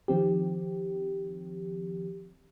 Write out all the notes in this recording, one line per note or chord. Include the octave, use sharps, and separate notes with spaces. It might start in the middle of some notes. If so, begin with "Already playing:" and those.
D#3 F3 C4 G4